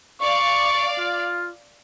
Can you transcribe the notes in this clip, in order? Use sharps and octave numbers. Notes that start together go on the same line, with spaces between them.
D5 F5 C#6
F4